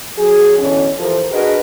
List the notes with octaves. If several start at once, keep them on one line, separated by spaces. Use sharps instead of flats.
F#3 G#4
B2 D3 E3 C#4
E3 F3 G4 A4 A#4 C5
D4 F#4 G#4 A#4 B4 D#5